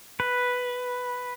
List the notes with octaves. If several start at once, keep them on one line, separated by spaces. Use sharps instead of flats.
B4